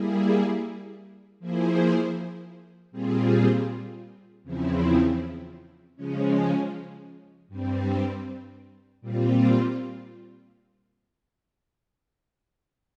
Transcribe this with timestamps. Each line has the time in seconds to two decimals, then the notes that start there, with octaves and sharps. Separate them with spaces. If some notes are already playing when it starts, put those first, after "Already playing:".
Already playing: G3 A#3 E4 G#4
1.40 F3 A#3 E4 G#4 C5
2.91 A#2 G3 C4 F4 G#4
4.44 E2 C#3 F3 C4 E4
5.96 C#3 F3 G#3 C#4
7.48 G2 G3 C4
9.01 A#2 G3 C4 F4